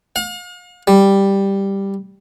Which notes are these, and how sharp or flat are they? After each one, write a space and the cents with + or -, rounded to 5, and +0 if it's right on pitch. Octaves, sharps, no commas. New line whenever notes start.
F5 +40
G3 +5